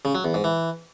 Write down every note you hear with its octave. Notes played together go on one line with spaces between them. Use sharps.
C#3
F#3
E2
G#2
E3